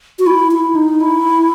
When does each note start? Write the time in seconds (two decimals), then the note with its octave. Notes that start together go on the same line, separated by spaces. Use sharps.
0.19 F#4
0.27 E4
0.52 E4
0.75 D#4
1.01 E4